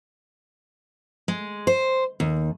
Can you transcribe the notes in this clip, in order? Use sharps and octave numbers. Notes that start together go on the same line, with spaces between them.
G#3
C5
D#2